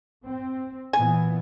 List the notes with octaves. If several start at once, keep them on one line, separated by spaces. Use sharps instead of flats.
C4
A#2 E3 B3 G#5